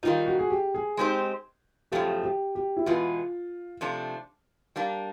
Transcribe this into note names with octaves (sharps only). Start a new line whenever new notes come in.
D#3 G3 A#3 D#4 F4
F#4
G#4
G4
G#4
G#3 C4 D#4 G4 C5
F#2 C#3 F3 A3 G4
G4
G4
E4
E2 B2 G#3 B3 F4
C3 F3 A3 D4
G3 A#3 D4